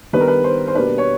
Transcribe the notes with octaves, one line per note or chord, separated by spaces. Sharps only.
D#3 G3 B3 D4 B4
A#4
B4
C5
C5
B2 G3 A#3 D4 B4
C#5